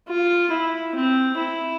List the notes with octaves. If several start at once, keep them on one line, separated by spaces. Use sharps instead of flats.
F4
E4
C4
E4